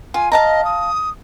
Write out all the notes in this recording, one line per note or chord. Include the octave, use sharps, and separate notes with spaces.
F4 G#5
D#5 F5 A5 A#5
D#6